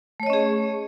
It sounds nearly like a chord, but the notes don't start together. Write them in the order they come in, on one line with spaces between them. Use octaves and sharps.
A3 C#5 D#5 C#4 G#4